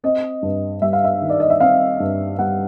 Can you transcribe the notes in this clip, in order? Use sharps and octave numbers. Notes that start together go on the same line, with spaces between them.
C4 D#5
G2
G3 E5
F5
E5
D#3
D5
D#5
E5
C4 F5
G2
G3 F#5